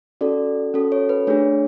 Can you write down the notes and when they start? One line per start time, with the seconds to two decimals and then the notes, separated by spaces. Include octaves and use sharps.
0.21 C#4 F#4 A4 D5
0.74 C#4 F#4 A4
0.92 C#5
1.09 B4
1.27 A3 D4 G#4 C#5